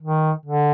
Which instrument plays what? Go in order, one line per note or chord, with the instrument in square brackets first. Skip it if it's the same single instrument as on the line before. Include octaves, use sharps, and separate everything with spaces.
[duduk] D#3
D3